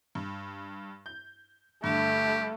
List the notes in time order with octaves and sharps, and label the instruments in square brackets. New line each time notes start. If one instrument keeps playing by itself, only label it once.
[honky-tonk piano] G2
G6
[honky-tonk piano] G2 D3 [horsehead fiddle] A3 [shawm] G4